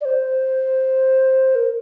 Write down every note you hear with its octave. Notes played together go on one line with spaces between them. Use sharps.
D5
C5
A#4